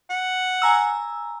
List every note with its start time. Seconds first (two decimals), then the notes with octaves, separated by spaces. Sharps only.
0.10 F#5
0.62 G#5 A#5 E6